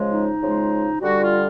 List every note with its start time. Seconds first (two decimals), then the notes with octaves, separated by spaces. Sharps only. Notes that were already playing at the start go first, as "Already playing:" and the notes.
Already playing: C#3 F3 G#3
0.12 D#4
0.41 C#3 F3 G#3
1.01 D3 G3 F#4
1.21 F4